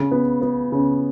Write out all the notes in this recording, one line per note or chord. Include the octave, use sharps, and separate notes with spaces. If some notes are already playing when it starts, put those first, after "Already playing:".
Already playing: C#3
B3
B3
C#3